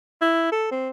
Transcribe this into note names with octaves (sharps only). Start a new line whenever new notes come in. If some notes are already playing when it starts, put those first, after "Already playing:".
E4
A4
C4